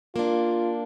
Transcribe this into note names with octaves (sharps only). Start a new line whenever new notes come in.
A#3 D4 F4